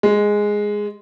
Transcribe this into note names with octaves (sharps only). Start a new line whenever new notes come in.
G#3